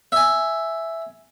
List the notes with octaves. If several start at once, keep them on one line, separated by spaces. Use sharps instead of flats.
E5 G#5